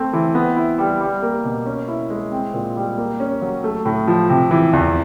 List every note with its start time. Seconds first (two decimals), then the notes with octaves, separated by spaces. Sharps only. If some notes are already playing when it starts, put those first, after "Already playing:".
Already playing: A3 C4
0.13 E3
0.35 B3
0.57 E4
0.78 G3
1.01 G3
1.22 A#3
1.45 B2
1.66 C#4
1.88 E4
2.10 G#3
2.32 C4
2.54 A#2
2.76 G3
2.97 A#3
3.20 C#4
3.42 F#3
3.64 A3
3.85 A2
4.08 F3
4.29 C3
4.51 E3
4.73 E2